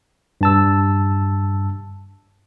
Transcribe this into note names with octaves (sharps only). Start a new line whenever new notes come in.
G2 A5 E6